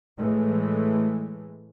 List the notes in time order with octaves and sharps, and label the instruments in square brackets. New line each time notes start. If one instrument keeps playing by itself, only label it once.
[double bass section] A2 E3 G#3 A3